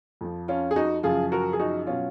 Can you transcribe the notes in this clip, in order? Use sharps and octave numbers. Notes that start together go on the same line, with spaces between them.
F2 F3
C#4 F4
G#4
D#4 F#4
F#2 C#3 F3 F4 G#4
F#4 A#4
G#4
D#4 F#4
B2 F#3 C#4 F4